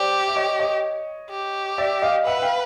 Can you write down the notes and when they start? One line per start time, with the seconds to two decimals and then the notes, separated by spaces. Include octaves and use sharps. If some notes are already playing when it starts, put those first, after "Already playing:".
Already playing: G4 C5 D5
0.28 E5
0.36 C#5 D#5
0.59 C#5 D#5
1.31 G4
1.78 D5 E5
2.02 D#5 F5
2.26 B4 E5 F#5
2.37 F#5
2.42 F5 G5